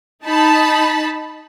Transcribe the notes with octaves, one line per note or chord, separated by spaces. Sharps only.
D#4 A5 B5